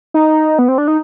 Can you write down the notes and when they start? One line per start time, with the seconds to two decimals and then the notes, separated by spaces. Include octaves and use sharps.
0.14 D#4
0.59 B3
0.68 C4
0.78 D4
0.88 D#4